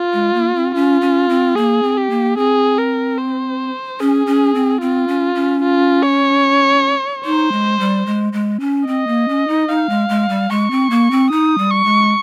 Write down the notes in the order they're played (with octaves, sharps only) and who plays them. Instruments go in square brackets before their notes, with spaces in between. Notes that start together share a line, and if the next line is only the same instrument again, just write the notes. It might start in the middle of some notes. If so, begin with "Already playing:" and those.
Already playing: [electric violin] F4
[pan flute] G#3
A#3
C4
[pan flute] C#4 [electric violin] F4
[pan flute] C#4
C4
[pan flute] A#3 [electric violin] G#4
[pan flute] C4
[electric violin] G4
[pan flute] A#3
[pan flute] C4 [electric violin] G#4
[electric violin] A#4
C5
[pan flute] C#4 [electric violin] G#4
[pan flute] C#4
C4
[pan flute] C4 [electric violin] F4
[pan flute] C#4
C#4
[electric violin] F4
C#5
[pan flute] D#4 [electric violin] C5
[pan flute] G#3
G3
G#3
G#3
C#4
[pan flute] C4 [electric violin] D#5
[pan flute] A#3
C#4
D#4
[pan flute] D#4 [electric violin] F5
[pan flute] G#3
G#3
G3
[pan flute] G#3 [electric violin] C#6
[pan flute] C4
A#3
C4
[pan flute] D#4 [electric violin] D#6
[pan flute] G3
[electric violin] C#6
[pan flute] G#3